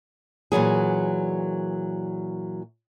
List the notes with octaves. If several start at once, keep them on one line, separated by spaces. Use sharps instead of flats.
A#2 E3 F#3 G#4